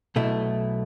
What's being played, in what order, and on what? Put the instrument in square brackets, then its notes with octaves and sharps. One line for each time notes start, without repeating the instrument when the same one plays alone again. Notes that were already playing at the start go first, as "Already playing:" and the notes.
[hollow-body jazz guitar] B1 B2 A3 E4